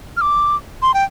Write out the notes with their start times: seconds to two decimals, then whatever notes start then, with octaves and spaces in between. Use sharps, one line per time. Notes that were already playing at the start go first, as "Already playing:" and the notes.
0.17 F6
0.21 D6
0.82 C6
0.94 G5